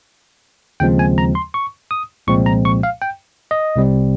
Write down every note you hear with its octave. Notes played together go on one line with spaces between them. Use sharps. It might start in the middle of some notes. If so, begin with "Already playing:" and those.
D#2 C#3 F3 G#3 C4 G5
G#5
A#5
C6
C#6
D#6
C2 A#2 F3 G#3 C4 C#6
A#5
C#6
F5
G5
D#5
C2 C3 G3 C4